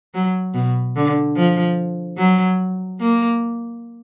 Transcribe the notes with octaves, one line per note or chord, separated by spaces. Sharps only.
F#3
B2
D3
F3
F#3
A#3